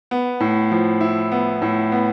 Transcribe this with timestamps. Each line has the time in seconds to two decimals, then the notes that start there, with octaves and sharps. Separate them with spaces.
0.11 B3
0.40 A2
0.71 F3
1.01 E4
1.32 B3
1.62 A2
1.92 B3